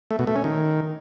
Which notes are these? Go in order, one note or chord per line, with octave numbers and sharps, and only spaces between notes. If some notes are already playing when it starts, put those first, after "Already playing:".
A3
B2
A3
C#4
D#3